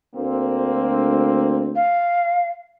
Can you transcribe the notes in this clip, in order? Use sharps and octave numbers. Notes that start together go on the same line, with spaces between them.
D2 A#3 C4
F5